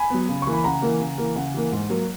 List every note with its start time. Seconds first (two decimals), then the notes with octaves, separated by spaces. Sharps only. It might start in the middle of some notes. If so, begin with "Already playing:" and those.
Already playing: G#5 B5
0.10 F#3 B3
0.28 C#3
0.42 E3 A#3 C#6
0.53 B5
0.64 C#3 F#5 A#5
0.82 E3 A#3
1.00 C#3
1.18 E3 A#3
1.36 C#3 F#5
1.54 E3 A#3
1.72 G#2
1.90 F#3 A#3